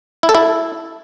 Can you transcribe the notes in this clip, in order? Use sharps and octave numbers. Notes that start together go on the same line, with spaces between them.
E4
A4
E4